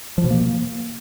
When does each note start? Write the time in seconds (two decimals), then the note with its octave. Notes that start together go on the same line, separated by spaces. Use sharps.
0.18 F3
0.24 B2
0.30 A#3